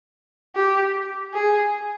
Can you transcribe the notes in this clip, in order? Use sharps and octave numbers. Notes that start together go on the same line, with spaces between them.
G4
G#4